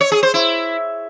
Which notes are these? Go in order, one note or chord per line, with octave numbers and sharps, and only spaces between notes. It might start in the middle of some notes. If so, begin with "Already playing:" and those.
C#5
G#4
C5
E4